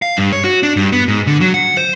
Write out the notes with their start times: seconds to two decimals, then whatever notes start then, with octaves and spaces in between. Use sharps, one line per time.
0.02 F5
0.17 G2
0.33 C#5
0.44 F#4
0.63 D4
0.77 G2
0.92 B3
1.08 G#2
1.27 D3
1.41 F#3
1.54 F#5
1.77 C5